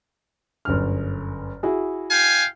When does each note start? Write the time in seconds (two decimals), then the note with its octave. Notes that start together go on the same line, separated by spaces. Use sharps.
0.65 G1 F#2 F6
1.63 E4 F#4 G#4
2.09 F5 G5 G#5